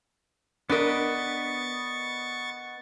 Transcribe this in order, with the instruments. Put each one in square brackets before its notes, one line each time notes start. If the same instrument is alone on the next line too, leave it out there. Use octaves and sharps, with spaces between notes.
[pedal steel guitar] B3 B4 D#5 [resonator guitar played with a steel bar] D4 A#4 [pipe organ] C#6 A6